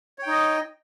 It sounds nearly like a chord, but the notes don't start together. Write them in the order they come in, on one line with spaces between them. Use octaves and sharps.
C#5 G5 D#4 D#5